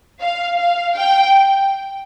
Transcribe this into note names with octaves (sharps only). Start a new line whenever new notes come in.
F5
F5
G5